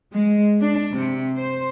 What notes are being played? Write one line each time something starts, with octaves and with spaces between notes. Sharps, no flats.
G#3
D4
C3
C5